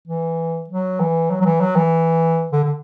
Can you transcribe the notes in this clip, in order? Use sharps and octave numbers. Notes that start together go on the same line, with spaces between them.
E3
F#3
E3
F#3
F#3
E3
F#3
E3
D3
D3